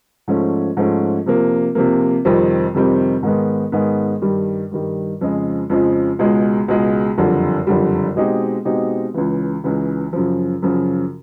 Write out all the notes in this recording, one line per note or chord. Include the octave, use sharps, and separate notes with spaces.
G#2 F3 A3 C#4
G#2 F3 A3 C#4
C3 F3 A#3
C3 F3 A#3
F2 C3 D#3 G3 C4
F2 C3 D#3 G3 C4
G#2 D#3 G#3 B3
G#2 D#3 G#3 B3
G2 D#3 G3
G2 D#3 G3
F2 C#3 F3 G#3
F2 C#3 F3 G#3
C#2 B2 G#3
C#2 B2 G#3
F#1 F2 D3 G3
F#1 F2 D3 G3
B2 G#3 C4 D#4 G4
B2 G#3 C4 D#4 G4
C#2 C#3 E3
C#2 C#3 E3
F#2 C#3 F3
F#2 C#3 F3